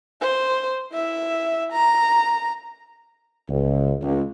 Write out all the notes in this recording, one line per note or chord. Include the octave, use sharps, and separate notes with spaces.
C5
E4 E5
A#5
C#2
C#2